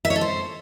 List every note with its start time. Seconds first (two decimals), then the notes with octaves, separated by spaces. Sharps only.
0.05 E5
0.10 C#5
0.16 A4
0.21 C5